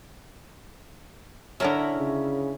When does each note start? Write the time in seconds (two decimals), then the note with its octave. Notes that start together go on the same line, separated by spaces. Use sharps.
1.60 D3 C#4 E4 A#4 E5 A#5
1.96 C#3